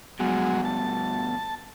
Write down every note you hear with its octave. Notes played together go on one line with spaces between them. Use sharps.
G2 B2 F#3 G#3
A5